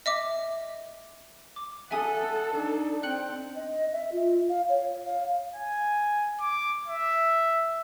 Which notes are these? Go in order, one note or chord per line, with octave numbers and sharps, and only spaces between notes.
D#5 E5 D6
D6
A4 E5 F#5 G#5 D#6
D4 D#4
C4 G5 F#6 C#7 F#7
D#5
E5
F4
F5
C#5
F5
G#5
D6
E5